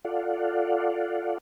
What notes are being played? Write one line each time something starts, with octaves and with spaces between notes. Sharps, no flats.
F4 A4 D5 F5 F#5